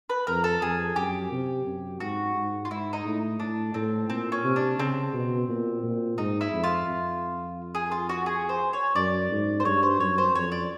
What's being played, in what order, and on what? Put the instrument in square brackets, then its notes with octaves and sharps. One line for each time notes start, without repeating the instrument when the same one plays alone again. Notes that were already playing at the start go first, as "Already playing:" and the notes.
[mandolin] B4
[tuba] F2 [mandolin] A#4
[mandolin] A4
[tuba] F2 [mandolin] G#4
[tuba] F#2 [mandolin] G4
[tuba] C3
F#2
[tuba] G#2 [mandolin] F#4
[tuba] G#2
[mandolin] F4
[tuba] G#2 [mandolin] E4
[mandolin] D#4
[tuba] A2
[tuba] A2 [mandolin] D4
[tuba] A2 [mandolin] C4
[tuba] A#2 [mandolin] C4
[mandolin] C#4
[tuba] C3
[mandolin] D4
[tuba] C#3 [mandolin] C4
[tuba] B2
A#2
A#2
[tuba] G#2 [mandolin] D#4
[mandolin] E4
[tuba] F2
[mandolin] F4
[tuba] F2
[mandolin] G#4
F4
F#4
G#4
C5
C#5
[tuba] F#2 [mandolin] D5
[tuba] G#2
[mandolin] C5
[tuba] G2 [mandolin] C#5
[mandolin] C5
[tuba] F#2 [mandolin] C#5
[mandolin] C5
[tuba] F2 [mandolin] C#5
[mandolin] D5